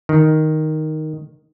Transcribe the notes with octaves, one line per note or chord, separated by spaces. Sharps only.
D#3